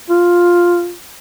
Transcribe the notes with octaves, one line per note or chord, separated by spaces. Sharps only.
F4